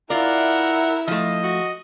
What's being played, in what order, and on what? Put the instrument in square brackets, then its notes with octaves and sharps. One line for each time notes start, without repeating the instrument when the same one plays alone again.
[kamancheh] E4 E5 [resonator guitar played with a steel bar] F4 D5 [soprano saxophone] A#4 [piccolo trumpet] F#5
[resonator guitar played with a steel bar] F3 A3 [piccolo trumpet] D#5
[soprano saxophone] F#4